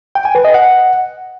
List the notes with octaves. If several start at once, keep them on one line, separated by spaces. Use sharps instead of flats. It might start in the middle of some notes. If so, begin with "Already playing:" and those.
G5
G#5
B4
D#5
F#5